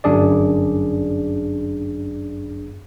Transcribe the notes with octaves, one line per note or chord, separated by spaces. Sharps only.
G1 F#2 D4 G#4 D5